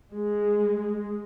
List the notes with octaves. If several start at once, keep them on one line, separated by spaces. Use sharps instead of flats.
G#3